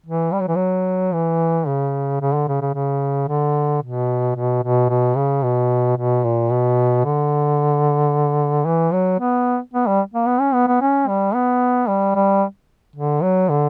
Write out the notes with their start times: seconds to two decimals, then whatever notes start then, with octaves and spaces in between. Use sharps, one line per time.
0.06 E3
0.33 G3
0.40 F#3
0.48 E3
0.56 F#3
1.13 E3
1.67 C#3
2.21 C#3
2.34 D3
2.48 C#3
2.61 C#3
2.74 C#3
3.28 D3
3.82 B2
4.36 B2
4.63 B2
4.89 B2
5.17 C#3
5.43 B2
5.97 B2
6.24 A#2
6.51 B2
7.05 D3
8.66 E3
8.93 F#3
9.20 B3
9.74 B3
9.87 G3
10.14 A#3
10.27 B3
10.40 C#4
10.54 B3
10.67 B3
10.81 C#4
11.08 G3
11.34 B3
11.88 G3
12.15 G3
12.96 D3
13.23 F#3
13.49 D3